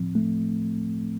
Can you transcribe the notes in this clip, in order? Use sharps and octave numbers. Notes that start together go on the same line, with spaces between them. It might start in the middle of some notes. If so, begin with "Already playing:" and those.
Already playing: A2 F3 C4
A3